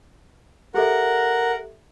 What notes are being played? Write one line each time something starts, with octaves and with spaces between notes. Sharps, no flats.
G4 A4 A#4 E5 F#5